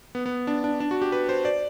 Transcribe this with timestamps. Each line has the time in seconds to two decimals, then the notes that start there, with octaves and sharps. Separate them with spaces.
0.15 B3
0.26 B3
0.47 D4
0.64 D4
0.80 D4
0.91 F#4
1.02 G4
1.12 B4
1.29 C5
1.45 D5